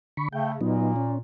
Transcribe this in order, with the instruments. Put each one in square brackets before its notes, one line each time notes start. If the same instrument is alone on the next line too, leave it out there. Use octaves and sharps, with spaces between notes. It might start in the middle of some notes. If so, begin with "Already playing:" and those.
[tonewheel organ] D3 B5 C#6
[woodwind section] C#3 A3 [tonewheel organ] G5
[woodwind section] A#2 [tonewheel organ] F#3 B3 D#4
[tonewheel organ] C#4